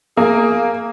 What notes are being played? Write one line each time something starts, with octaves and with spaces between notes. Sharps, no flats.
A#3 G#4